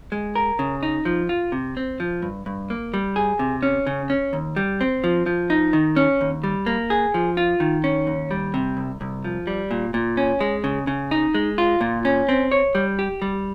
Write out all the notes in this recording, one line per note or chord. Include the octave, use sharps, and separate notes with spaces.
G#3
A#4
C#3
D#4
F3
F4
C3
C4
F3
G2
G2
A#3
G3
G#4
C3
C#4
C#3
C#4
D#2
G3
C4
F3
F3
D#4
D#3
C#4
D#2
G3
A#3
G#4
F3
F4
D#3
C#4
D#2
G3
C3
C2
C2
F3
G3
A#2
A#2
C#4
G#3
C#3
C#3
D#4
G#3
F4
A#2
C#4
C4
C#5
G3
G4
G3